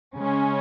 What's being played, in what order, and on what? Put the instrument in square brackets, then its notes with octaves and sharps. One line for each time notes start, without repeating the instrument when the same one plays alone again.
[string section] C#3 G#3 C#4